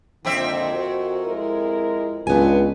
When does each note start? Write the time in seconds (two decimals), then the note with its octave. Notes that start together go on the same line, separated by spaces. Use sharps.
0.25 F2 A#2 D3 D#3 C4 E5
0.73 F#4 A#4
1.25 G#3 E4 A#4
2.27 C#2 B3 D4 F4 B4 G#5